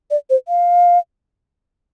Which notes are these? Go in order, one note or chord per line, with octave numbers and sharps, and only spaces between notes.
D5
C5
F5